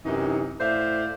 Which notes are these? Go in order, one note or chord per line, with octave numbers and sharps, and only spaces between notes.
F#2 C3 E3 D#4
A2 C5 D5 E5 F5